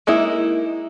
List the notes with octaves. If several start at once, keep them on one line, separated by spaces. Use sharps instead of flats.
G#3 A#3 D#4 E4